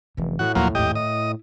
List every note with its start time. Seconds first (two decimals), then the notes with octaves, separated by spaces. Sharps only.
0.17 F1 F#2 E3
0.39 A2 F#4
0.55 E1 D#2 F3 F#3 A#3
0.75 G#1 D#2 G4 D#5
0.95 E4 D#5